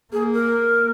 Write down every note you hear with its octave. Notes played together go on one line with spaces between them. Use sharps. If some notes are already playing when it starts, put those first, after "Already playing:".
A#3 G#4
A#4